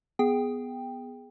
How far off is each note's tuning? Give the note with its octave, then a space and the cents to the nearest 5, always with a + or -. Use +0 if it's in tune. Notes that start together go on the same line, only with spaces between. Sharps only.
B3 +0 G#4 +0 G5 +10